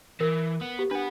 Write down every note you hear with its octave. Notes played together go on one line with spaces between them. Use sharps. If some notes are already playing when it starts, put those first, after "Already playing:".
E3 A#4
B3
G4
D4 B4 F#5